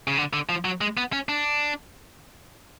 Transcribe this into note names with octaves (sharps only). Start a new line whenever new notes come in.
C#3
D3
D3
F3
F#3
G#3
B3
C#4
D4